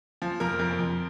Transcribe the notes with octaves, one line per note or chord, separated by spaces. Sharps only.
F3
F2 A#4
F2 A#4
F2